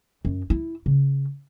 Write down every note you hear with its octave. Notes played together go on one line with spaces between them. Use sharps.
F#2
E4
C#3